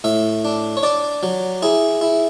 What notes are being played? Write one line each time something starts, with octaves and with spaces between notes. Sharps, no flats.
A2 E5
D4
C#5
D4 D5
F#3
E4 G#4
E4